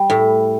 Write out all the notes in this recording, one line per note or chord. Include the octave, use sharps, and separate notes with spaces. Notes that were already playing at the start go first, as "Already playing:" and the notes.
Already playing: G3
A2